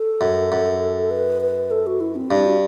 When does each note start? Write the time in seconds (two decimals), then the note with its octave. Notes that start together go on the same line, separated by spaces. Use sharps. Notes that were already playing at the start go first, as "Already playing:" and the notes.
Already playing: A4
0.21 F#2
0.52 F#2
1.11 B4
1.42 B4
1.71 A4
1.86 F#4
2.00 E4
2.15 C4
2.31 G2 D4
2.46 F#4